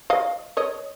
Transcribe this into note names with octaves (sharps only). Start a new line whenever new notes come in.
D#5 F5
C#5 D#5